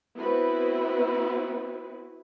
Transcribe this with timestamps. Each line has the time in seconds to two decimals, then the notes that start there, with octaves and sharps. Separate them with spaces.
0.16 B3 C4 E4 F#4 B4